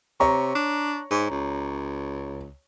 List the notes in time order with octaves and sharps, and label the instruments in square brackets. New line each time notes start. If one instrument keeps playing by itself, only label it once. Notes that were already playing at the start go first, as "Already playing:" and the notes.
[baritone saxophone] C3 [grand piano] C#5 A#5 C#6
[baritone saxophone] D4
G#2
C#2